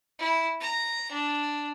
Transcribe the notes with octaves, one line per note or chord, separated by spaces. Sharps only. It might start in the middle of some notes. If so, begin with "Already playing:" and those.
E4
A#5
D4